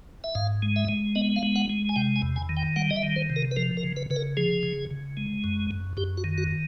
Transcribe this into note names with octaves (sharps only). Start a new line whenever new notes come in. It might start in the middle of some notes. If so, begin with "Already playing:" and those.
E5
G#2 F5
G#3
E5
G#3
B3 D#5
F5
G#3
F#5
G#3
G#5
C3 G5
G#5
E2
G#5
D#3
G5
G3 F#5
D#5
E5
D#3
C5
C3
A#4
B4
F3 A#4
A#4
C#3
B4
C#3 B4
A#4
F3 G#4
C#3
C#3
G#3
F#2
F#2
F#2 G4
F#4
D#3
F#4